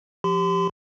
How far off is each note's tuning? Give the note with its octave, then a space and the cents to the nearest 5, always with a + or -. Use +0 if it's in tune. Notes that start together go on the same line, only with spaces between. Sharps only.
F3 +0 G4 +0 C6 -40